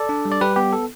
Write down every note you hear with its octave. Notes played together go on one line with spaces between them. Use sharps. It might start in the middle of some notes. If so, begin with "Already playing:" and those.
Already playing: A4 D5
D4
G3
D5
G3 G4 B4
B3 G4
A4